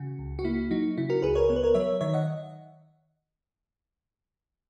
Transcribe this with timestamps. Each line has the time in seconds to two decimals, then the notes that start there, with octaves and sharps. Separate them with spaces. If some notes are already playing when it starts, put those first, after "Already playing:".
Already playing: C#3 F#4
0.19 C#2
0.39 F#4
0.44 A#3 E4
0.71 F#3 D#4 F#4
0.98 C#3 E4
1.10 F#4 A#4
1.22 C#2 G#4 B4
1.35 A#4 C#5
1.49 B3 C#5
1.56 B4
1.63 A#4 C#5
1.74 F#3 C#5 E5
2.01 D#3 C#5 E5
2.13 D#5 F#5